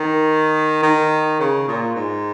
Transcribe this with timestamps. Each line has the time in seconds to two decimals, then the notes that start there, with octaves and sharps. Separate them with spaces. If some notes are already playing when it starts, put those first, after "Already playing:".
Already playing: D#3
0.83 D#3
1.40 C#3
1.68 A#2
1.95 G#2